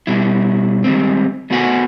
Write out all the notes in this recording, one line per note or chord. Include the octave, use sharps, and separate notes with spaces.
B2 G3 E4
D#3 G3 G#3 C4
A3 B3 F#4 C5 F#5 G#5